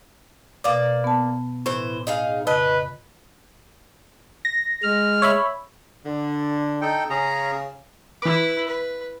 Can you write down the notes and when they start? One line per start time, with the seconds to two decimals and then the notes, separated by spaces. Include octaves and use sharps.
0.64 B2 A#3 D5 F5 D6
1.04 B3 A5
1.66 A2 E3 C5
2.07 D#4 G#4 F5
2.47 F2 C#3 B4 D#5
4.45 A#6
4.83 G#3 F6
5.22 C#5 E5 B5
6.05 D3
6.81 D#4 A4 G5
7.10 C#3 C#4 G#4 A#5
8.22 E3 E4 B4 D6
8.68 B4